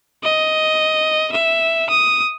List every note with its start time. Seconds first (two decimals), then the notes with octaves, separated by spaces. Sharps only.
0.23 D#5
1.33 E5
1.90 D#6